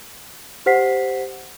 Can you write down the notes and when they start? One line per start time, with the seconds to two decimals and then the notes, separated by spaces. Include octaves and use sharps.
0.66 G4 C5 F#5 B6 C7